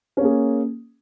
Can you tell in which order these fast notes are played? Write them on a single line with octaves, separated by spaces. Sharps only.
C#4 A#3 G#4